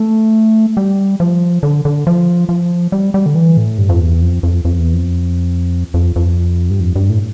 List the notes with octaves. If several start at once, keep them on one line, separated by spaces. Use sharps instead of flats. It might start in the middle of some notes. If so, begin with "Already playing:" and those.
Already playing: A3
G3
F3
D3
D3
F3
F3
G3
G3
D3
E3
A2
G2
F2
E2
F2
F2
F2
E2
F2
F2
F2
G2
F2
G2
A2